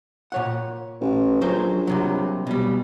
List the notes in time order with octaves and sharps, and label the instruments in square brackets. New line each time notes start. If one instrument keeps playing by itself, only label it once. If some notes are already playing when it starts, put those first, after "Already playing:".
[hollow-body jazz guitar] A#2 C#5 F#5
[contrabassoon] A1
[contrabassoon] A#1 [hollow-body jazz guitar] F#3 C5
[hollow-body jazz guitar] C2 C3 F#3
B2 G3